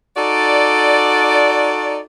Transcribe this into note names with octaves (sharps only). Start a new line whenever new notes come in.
D#4 F#4 A4 D5